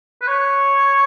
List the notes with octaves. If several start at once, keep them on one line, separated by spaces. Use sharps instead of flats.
B4
C#5